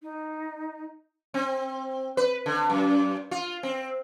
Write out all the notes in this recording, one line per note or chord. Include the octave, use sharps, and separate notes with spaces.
D#4
C4
B4
D3
F#2
F4
C4